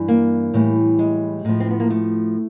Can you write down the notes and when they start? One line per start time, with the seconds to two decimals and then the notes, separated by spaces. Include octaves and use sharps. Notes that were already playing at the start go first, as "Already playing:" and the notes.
Already playing: G2 E3
0.08 A#3
0.54 A2 E3 G3
0.99 G#3
1.45 A2 F3
1.60 C4
1.71 B3
1.80 A#3
1.90 A3